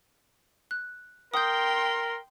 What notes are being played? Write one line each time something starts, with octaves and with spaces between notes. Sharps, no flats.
F#6
A#4 G5 C6 D#6 G6